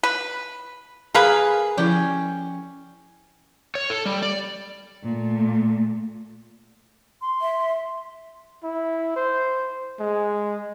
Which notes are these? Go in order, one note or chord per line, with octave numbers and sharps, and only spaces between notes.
B4
A#3 G#4 A#4 B4
F3 C#4 E4 G5
C#5
A4
G3
D5
A#2 A3
C6
E5
E4
C5
G#3